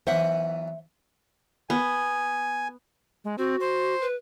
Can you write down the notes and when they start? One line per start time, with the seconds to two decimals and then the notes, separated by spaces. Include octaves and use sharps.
0.07 B1 E3 C5 E5 F#5
1.70 B3 G#5
3.24 G#3
3.38 C4 F#4
3.60 C5
4.01 B4